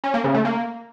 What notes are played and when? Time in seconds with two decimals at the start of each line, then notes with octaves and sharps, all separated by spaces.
0.04 C#4
0.14 A#3
0.24 C#3
0.34 A3
0.45 A#3